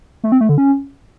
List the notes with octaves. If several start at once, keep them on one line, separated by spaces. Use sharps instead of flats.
A3
C4
A3
D3
C#4